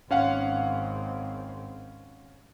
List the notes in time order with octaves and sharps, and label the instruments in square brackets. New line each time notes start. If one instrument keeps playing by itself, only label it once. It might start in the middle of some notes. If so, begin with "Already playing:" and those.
[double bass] G#1 C4 [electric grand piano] C#4 F5 F#5